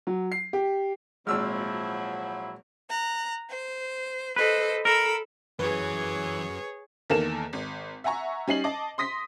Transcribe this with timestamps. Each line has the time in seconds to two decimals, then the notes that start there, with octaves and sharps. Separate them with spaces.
0.07 F#3
0.32 C7
0.53 G4
1.27 G#1 A#2 F3 F#3 G#3 E4 E6 F6
2.89 A#5 F#6
3.49 C5
4.36 A4 B4 C5 D#5
4.85 A4 A#4 B5 E6
5.59 F#2 E3 G#4 B4 C#5
7.10 E2 D#3 A#3 A4 A#4 E7
7.53 G#1
8.04 E5 F#5 G#5 A#5 C#6
8.48 G3 C#4 D#4 C7 F#7
8.64 D#5 A5 D6
8.98 C6 D#6 A#6 B6